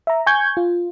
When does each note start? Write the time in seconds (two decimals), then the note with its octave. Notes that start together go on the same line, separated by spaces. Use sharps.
0.07 E5 A#5
0.26 G#5 C#6 G6 G#6
0.57 F4